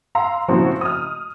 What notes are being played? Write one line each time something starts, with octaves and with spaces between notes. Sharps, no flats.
F5 A#5 C6 E6
A#2 C#3 F3 C4 E4 F#4
D#6 F6